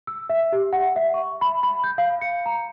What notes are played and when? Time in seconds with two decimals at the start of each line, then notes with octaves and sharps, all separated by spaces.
0.07 E6
0.29 E5
0.52 G4
0.73 F#5
0.96 E5
1.14 C#6
1.41 B5
1.63 B5
1.84 G6
1.98 F5
2.21 C#7
2.46 A#5